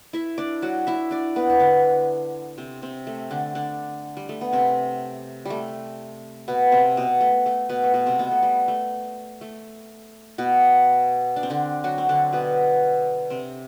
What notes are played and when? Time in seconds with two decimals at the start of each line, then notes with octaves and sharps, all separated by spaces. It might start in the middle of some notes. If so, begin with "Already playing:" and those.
0.13 E4 E5
0.38 D4 D5
0.62 F#3 F#4
0.87 E4 E5
1.11 D4 D5
1.36 B3 B4
1.50 E4
1.60 D3 D4
2.58 C3 C4
2.82 C3 C4
3.07 A3
3.31 D3 D4
3.55 D3 D4
4.17 G3
4.29 A3
4.41 B3
4.53 C3 C4
5.45 G3 A3
6.48 B2 B3
6.72 C3 C4
6.97 B2 B3
7.21 A3
7.46 A3
7.69 B2 B3
7.84 A3
7.94 B2 B3
8.06 C3 C4
8.19 B2 B3
8.31 A3
8.42 G3
8.68 A3
9.41 A3
10.38 B2 B3
11.36 D4
11.43 C4
11.50 D3 D4
11.84 F#3 F#4
11.98 C4
12.09 D3 D4
12.33 B2 B3
13.30 C3 C4